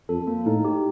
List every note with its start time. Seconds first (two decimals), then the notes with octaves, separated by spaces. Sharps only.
0.09 F2 A4
0.27 A#3
0.46 A2 D#4
0.65 G4